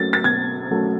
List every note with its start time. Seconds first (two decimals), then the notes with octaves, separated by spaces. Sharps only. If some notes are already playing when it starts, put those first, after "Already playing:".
Already playing: F#3 A3 C#4 A6
0.13 A6
0.24 B2 G#6
0.71 F#3 A3 C#4